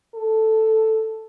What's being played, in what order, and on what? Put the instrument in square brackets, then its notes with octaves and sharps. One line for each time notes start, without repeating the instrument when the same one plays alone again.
[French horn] A4